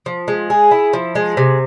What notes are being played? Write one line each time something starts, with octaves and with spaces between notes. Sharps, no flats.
F3
G#3
G#4
E4
F3
G#3
C3